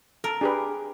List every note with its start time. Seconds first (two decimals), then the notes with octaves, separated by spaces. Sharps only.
0.24 A4 A#4
0.41 D4 G4 G#4 B4